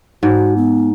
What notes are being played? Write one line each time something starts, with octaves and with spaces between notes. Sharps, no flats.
G#2 F#4
B3